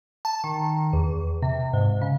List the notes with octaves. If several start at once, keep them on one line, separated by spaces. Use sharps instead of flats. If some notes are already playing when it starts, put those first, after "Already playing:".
A5
D#3
E2
C3
G#2
C#3